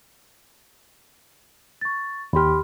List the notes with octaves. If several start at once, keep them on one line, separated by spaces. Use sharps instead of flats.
C#6 A6
D#2 G4 B5 C6 F6